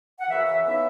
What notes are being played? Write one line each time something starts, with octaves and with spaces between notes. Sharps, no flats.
F#5
F#2 C#3 E3 E5
E5
C#3 E3 B3 D#4 E5